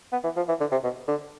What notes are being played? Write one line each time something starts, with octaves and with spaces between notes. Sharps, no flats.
B3
E3
F3
E3
D3
C3
B2
D3